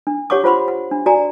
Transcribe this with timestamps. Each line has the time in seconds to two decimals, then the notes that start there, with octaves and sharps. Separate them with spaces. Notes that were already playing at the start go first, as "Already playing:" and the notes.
0.07 D4
0.30 G4 C#5 F#5 C#6 D6
0.44 F4 C5 F#5 B5 C6
0.68 F#5
0.91 D4
1.06 F#4 D5 G#5 A#5